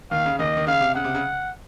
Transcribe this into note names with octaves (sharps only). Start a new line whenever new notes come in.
D#2 D#3 F5
C#3
D#2 D#3 D#5
D#3
C#3 F5
C3
C#3 F#5
C3
C#3